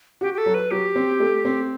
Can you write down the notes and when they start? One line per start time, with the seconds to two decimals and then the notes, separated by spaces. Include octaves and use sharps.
0.21 F#4 G4
0.34 G4
0.38 A4
0.46 F#3
0.54 B4
0.71 F#3 G4
0.95 C4
1.20 A3
1.45 C4